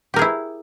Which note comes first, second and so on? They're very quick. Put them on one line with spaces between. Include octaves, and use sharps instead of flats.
G4 A#4 G#4 E4